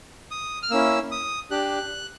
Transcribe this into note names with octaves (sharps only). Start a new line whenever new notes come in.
D#6
F6
A#3 C#4 E4 E6
D#6
D4 G4 F#6